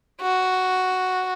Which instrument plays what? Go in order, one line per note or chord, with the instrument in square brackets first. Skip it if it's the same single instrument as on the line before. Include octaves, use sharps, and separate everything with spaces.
[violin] F#4